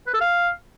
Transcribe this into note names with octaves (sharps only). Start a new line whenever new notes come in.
B4
A4
F5